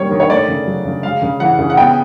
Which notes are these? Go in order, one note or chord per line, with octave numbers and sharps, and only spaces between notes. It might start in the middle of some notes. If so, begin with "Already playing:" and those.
Already playing: D#3 G3 A#3 C#5
D#3
C#5
A3 D5
C#3
F#3
C#3
G#3 F5
C#3
E3 F#5
C#3
F#5
B3 G5